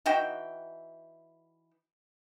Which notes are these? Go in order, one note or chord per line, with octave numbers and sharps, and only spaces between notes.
E3 D#4 F#4 G5